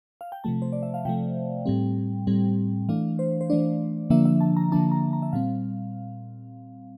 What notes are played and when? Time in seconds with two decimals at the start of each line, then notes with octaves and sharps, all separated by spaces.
0.21 F5
0.32 G5
0.44 C3 F3 A3 A5
0.62 C5
0.72 D5
0.83 E5
0.94 F5
1.05 C3 F3 A3 G5
1.66 A2 G3 C4
2.27 A2 G3 C4
2.89 E3 A3 D4 F5
3.19 C5
3.41 C5
3.50 E3 A3 D4 D5
4.10 D3 F3 A#3 D4 E5
4.25 E5
4.41 A5
4.57 A#5
4.72 D3 F3 A#3 D4 A5
4.92 A#5
5.13 A#5
5.22 E5
5.33 A#2 G3 C4 F5